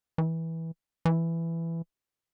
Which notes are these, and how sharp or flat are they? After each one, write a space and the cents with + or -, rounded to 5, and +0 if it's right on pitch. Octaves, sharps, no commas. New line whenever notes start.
E3 -15
E3 +10